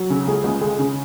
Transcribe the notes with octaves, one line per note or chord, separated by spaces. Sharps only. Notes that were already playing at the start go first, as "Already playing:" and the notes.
Already playing: F#3
C#3
C#2 G#4
C#2
G#3 G#4
C#3